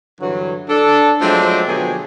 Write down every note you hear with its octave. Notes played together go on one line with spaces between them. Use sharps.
G2 D3 E3 F#3
D4 A4
F3 F#3 G#3 A3 C4 D4
B2 D3 F3 F#3 G4 G#4